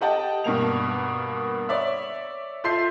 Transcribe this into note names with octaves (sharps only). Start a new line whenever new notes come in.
G4 A4 D#5 F#5 G5 A5
G2 B2 A#3 F7
C#5 D5 E5
F4 A4 E5 C6 G6 C7